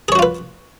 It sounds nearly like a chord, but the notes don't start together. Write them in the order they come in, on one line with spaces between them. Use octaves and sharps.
G#4 C#5 F#4 F4 B4